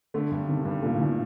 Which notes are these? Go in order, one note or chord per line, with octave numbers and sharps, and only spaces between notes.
D3 A3
G2
C3 D#3
G2
A#2 A3
A2
A#2 D#3